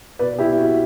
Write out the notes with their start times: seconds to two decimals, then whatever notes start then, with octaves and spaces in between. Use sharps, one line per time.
0.19 B2 B4 D5
0.39 E4 G4
0.58 F#4